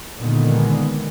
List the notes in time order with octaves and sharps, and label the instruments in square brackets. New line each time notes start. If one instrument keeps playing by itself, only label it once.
[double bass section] A#2 D3 D#3 G#3 B3